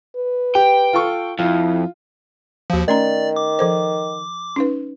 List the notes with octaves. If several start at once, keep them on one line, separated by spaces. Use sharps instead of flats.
B4
G4 G5
F4 A4 C#6
F2 E4 F4
D#2 F3 F#4 F5
D#3 A3 C#4 D5 A#5
D6
F3 A4 C5
C#4 D#4 B4